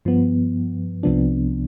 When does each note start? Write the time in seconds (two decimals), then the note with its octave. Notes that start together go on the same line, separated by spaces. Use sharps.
0.05 G2 F3 B3
1.03 C2 C3 F3 B3 D4